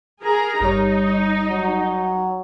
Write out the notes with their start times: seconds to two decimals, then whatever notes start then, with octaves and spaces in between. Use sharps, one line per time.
0.23 G#4 A#4 A#5
0.61 G1 G3 D#4 C#5
1.50 F#3